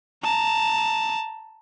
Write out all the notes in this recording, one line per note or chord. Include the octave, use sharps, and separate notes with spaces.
A5 A#5